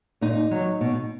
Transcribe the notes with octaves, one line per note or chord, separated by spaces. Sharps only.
A#2 D#4
F#3
B2